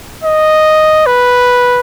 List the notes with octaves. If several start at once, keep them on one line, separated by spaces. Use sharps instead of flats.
D#5
B4